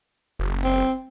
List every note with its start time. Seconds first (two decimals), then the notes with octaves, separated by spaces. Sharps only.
0.39 F#1
0.64 C4